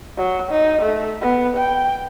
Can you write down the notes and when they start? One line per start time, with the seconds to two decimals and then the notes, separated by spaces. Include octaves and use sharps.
0.17 F#3
0.51 D#4
0.82 A3
1.21 B3
1.57 G5